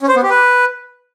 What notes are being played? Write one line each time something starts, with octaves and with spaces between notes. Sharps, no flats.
C#4
C5
B3
G4
B4